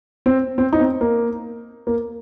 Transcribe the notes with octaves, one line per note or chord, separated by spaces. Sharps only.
C4
C4
D#4
C4
A#3
A#3